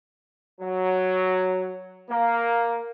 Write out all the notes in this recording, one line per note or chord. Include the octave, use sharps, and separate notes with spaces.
F#3
A#3